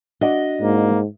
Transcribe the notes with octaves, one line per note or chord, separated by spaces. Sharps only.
D4 F#4 D5 D#5
G#2 A#3